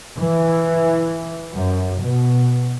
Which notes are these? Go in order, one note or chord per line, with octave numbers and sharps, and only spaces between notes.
E3
F#2
B2